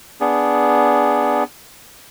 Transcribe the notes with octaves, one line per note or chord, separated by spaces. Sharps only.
B3 D4 G#4